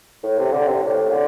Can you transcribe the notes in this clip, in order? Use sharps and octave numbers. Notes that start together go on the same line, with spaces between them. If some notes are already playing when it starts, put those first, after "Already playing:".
A2
C3
D3
C3
A2
D3